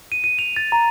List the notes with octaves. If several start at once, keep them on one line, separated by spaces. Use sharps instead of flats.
D#7
D#7
F7
A6
A#5